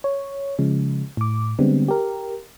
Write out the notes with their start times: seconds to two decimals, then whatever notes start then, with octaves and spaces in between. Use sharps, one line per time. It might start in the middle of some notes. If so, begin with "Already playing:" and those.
0.04 C#5
0.59 C#3 F3 G#3
1.17 A2 D6
1.59 D3 G3 G#3 B3 C4
1.88 G4 A#4